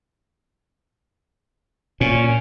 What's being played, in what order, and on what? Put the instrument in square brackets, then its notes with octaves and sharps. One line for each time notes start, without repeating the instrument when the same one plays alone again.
[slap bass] A#2 [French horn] C#4